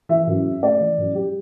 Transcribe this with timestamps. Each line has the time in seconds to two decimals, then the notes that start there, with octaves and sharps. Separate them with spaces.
0.09 E3 E5
0.27 F#2
0.46 C#3
0.62 A3 D5
0.80 E3
0.98 F#2
1.15 G3 G4